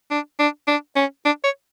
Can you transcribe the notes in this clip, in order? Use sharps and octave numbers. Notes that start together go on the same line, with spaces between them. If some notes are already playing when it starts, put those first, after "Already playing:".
D4
D4
D4
C#4
D4
C#5